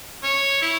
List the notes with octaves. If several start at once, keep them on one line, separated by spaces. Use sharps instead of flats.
C#5
E4